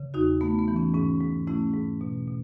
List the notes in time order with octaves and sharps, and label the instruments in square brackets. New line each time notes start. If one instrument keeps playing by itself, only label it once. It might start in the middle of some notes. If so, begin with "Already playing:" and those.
Already playing: [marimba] C#3
E2 D#4 F#4
A3 B3 D#4
B3
E3
C#4
G#2 C#4
G#2
A3 C#4 E4
G#2
B2
B2